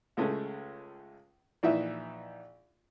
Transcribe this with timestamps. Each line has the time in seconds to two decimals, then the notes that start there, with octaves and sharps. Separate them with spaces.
0.17 C#2 G#3 A3 C#4
1.63 A#1 E3 D#4 E5